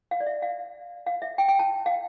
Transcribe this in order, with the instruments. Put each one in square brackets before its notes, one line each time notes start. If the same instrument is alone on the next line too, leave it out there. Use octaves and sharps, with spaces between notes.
[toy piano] F5
D5
E5
F5
F5
E5
G5
G5
A5
F5